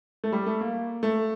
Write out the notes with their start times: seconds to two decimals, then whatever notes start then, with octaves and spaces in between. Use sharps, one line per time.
0.24 A3
0.32 G3
0.46 A3
0.61 A#3
1.03 A3